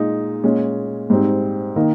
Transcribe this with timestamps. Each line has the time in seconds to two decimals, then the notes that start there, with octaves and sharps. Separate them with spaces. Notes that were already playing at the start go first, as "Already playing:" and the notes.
Already playing: A#2 G#3 D#4
0.44 A#2 G#3 C#4
1.10 G#2 G3 C4
1.76 D#3 A#3 D#4